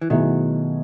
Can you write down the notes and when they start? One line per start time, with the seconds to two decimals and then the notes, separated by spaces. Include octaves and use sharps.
0.01 E3
0.10 B2 D#3 F#3 A3 E4 G#4